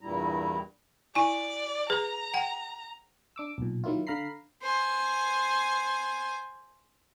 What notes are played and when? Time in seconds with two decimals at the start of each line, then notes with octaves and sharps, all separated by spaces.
0.01 E2 G2 A#2 G3 E4 A#5
1.15 E4 D5 G#5
1.90 G#4 B4 A#5
2.34 F#5 G5
3.36 D4 D6 E6
3.58 B1 A#2
3.84 D#3 F#3 A#3 E4 F4
4.07 D3 F5 A#5 B5 C7
4.62 C5 G#5